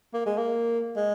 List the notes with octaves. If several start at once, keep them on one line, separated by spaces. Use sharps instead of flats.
A#3
G#3
A#3
G#3